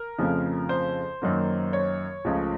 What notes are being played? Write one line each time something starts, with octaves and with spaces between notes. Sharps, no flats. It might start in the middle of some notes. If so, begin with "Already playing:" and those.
Already playing: A#4
F2 C#3 F3 A3
C5
F#2 D#3 F#3 A#3
C#5
C#2 C#3 F3 A3